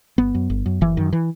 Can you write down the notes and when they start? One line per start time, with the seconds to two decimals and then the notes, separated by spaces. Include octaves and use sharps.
0.18 G1 B3
0.35 F#2
0.50 G1
0.66 F#2
0.81 F#1 E3
0.97 F#2 D#3
1.13 E3